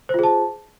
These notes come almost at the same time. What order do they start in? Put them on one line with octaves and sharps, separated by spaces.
C5 F4 G#4 A5